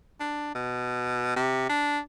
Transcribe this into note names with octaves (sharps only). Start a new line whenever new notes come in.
D4
B2
C3
D4